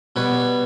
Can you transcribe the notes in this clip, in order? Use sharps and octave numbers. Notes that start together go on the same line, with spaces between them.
B2 G3 B4 C#5